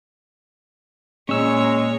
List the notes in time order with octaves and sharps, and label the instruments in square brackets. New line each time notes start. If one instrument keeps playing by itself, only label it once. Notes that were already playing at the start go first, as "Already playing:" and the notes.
[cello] A#2 [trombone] G#3 [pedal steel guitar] C#4 E6 [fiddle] C#5